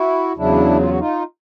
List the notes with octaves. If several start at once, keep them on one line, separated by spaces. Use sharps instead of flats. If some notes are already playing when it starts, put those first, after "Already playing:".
Already playing: E4 F#4
E2 C#3 F#3 D4 E4
F4
F#4
D#4 F4